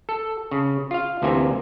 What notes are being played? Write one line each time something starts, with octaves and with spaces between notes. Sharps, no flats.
A4
C#3
F4 F5
D2 C3 E3 A#3 G#5